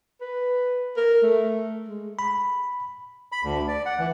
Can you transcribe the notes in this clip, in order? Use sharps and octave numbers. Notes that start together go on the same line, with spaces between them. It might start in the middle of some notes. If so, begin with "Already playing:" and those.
B4
A#4
A3
G#3
B5
B5
D2
D5
F#5
E3